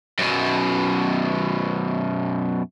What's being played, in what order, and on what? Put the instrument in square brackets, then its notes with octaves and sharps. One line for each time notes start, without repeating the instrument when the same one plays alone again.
[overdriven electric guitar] F#2 B2